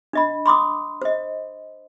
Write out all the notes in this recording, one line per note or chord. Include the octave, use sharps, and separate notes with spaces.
D4 D#5 B5
B5 C6 D6 D#6
C5 D#5